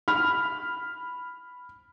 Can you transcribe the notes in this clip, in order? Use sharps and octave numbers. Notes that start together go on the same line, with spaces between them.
B5 F6